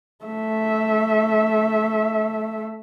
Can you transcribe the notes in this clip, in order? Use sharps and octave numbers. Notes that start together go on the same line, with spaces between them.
A3 E5